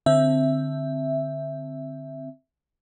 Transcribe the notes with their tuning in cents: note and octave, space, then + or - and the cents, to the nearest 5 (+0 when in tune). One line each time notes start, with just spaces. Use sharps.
D3 +0 C4 +0 E5 +0